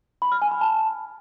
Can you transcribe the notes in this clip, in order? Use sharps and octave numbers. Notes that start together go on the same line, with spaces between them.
B5
F6
G#5
B5
A5